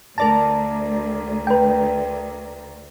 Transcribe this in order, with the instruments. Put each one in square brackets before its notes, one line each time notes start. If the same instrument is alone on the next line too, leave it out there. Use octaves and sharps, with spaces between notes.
[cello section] D2 [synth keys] A#4 D5 A#5 [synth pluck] A5
[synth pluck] B4 G5